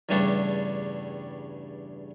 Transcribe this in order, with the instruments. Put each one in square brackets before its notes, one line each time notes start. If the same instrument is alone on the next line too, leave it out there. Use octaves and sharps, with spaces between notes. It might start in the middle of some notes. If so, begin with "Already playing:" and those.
[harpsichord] E2 G2 C#3 G3 A3 D4